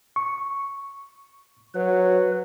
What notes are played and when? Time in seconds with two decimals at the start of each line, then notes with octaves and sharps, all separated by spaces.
0.16 C#6
1.75 F#3 B4